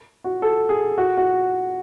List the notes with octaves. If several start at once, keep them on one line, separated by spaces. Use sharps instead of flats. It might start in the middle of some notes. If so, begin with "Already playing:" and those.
F#4
A4
G#4
F#4
F#4